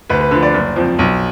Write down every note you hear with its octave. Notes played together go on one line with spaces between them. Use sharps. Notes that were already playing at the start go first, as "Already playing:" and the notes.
D2 B4
B4
D3 F3 B4
D5
F#1
F2 F3
B1